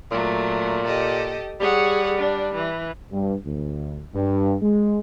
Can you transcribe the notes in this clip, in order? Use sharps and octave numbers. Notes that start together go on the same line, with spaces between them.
A#2 F#3 A3
G4 A4 D#5
G3 G#4 C#5 F#5
D4
E3
G2
D2
G2
G#3